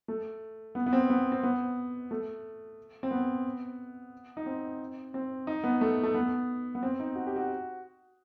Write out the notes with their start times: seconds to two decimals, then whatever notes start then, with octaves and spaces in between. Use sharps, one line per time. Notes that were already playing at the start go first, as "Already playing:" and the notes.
0.08 A3
0.75 B3
0.86 B3
0.93 C4
1.10 B3
1.32 C4
1.43 B3
2.11 A3
3.03 C4
3.11 B3
4.37 D#4
4.46 C4
5.14 C4
5.47 D#4
5.64 B3
5.81 A3
6.03 A3
6.14 B3
6.75 B3
6.83 C4
7.00 D#4
7.15 F#4
7.27 G4
7.36 F#4